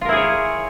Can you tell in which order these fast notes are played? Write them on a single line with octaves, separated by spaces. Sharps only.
F4 A#4 E4 G#4 C#5